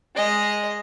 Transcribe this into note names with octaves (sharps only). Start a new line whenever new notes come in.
G#3 D#5